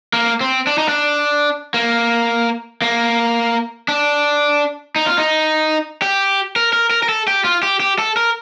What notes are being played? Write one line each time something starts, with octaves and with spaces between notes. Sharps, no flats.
A#3
C4
D4
D#4
D4
A#3
A#3
D4
D#4
F4
D#4
G4
A#4
A#4
A#4
A#4
A4
G4
F4
G4
G4
A4
A#4